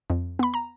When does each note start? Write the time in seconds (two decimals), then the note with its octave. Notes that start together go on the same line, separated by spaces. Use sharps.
0.10 F2
0.39 B3 B5
0.54 A#5